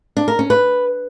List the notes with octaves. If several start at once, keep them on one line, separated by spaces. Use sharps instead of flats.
D4
A#4
C#4
B4